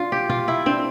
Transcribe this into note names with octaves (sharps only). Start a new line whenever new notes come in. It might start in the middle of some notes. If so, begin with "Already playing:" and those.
Already playing: D4 F4
G4
B2 F4
E4
C4 D4